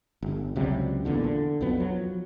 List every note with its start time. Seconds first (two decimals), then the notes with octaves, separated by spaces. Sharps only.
0.22 G1
0.56 C#2 C3 F#3 G3
1.05 B1 E2 A#2 D3
1.24 D3
1.61 B1 F2 B3
1.78 F3 F#3